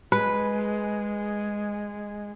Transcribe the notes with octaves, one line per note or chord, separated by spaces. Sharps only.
G#3 B4